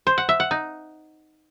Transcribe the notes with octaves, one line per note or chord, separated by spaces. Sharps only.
C5
F#5
E5
F#5
D#4